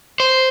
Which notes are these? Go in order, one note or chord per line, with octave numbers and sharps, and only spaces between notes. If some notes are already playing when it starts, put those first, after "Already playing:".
C5